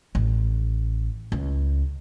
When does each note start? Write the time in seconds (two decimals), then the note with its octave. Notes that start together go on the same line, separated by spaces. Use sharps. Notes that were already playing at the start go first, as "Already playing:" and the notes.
0.15 A1
1.32 C#2